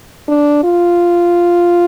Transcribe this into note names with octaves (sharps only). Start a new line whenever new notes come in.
D4
F4